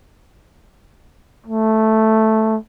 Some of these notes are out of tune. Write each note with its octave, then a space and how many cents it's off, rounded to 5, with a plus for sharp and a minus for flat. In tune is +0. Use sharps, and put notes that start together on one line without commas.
A3 +0